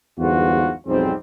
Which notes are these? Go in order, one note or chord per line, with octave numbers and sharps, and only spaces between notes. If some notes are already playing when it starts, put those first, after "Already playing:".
G1 E2 G#2 F4 F#4
B1 F2 G#2 G3 C4